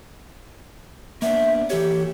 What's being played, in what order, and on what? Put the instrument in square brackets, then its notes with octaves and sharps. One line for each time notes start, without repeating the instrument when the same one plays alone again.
[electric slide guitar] A#3 B3 D4 [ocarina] E5
[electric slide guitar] E3 A4 C#5 [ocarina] G4